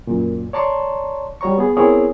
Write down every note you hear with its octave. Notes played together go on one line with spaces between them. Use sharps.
F#2 A#2
C#5 D5 A5 A#5 C6 C#6
G3 F#4 C#5 A#5 C#6
B3 G#4
B3 C4 E4 G#4 A#4 C#5